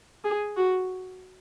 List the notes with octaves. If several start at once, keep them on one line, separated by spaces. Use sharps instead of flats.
G#4
F#4